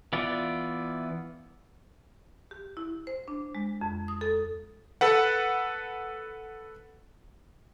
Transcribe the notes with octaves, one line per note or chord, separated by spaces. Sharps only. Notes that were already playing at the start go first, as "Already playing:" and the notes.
E3 B3 F4 D5
G4
E4
C5
D4
G#3
F2
D#6
A4
A4 B4 F#5